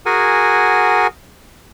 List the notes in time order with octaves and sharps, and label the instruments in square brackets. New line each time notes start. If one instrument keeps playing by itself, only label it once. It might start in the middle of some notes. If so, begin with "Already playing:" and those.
[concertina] F#4 G#4 A#4 F#5 G#5